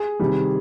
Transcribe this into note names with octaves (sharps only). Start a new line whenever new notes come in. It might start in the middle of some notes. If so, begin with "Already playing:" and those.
Already playing: G#4
C3 D#3 G3